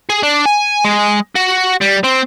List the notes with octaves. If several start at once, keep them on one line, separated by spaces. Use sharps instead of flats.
G#4
D4
G#5
G#3
F#4
G3
C4